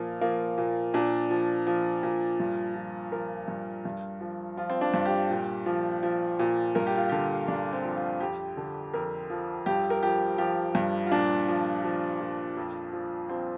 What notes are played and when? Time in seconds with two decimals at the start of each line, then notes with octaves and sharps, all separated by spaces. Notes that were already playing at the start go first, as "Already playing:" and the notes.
Already playing: A#2 F3 A#3
0.21 F3 A#3
0.58 A#2
0.94 A#2 D4
1.30 F3
1.67 F3
2.03 A#2
2.40 G2
2.75 F3
3.12 F3 A#4
3.48 G2
3.85 G2
4.20 F3
4.57 F3 F4
4.70 C4
4.81 D4
4.94 G2
5.06 G4
5.30 A#2
5.66 F3
6.03 F3
6.39 A#2
6.75 G2 A#4
6.87 G4
6.97 F4
7.09 D3 G4
7.48 G2 D4
7.73 C4
7.85 F3
7.96 F4
8.20 F2 G4
8.57 D3
8.94 F2 A#4
9.30 F3
9.66 G2 G4
9.90 A#4
10.03 F3 G4
10.38 F3 G4
10.75 G2
11.06 F4
11.11 A#2 D4
11.48 F3
11.84 F3
12.20 A#2
12.57 F2
12.93 F3
13.30 F3 C4